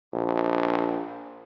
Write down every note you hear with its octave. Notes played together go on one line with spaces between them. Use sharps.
A#1